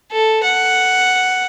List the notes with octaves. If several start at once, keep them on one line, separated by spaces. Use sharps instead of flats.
A4
F#5